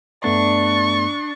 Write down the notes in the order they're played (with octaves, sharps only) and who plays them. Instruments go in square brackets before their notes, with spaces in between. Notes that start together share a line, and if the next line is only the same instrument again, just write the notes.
[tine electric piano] G2 A3 B3 [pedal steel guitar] D4 [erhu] C#6